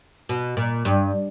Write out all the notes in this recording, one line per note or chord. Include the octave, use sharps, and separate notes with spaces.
B2
A#2
G2